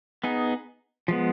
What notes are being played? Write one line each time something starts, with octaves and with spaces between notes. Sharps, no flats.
B3 D#4 G#4
F3 G#3 B3